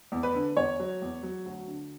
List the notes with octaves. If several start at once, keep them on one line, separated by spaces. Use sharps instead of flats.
E2
B4
D3
E2 C#5
F#3
E2
F#3
D2
D3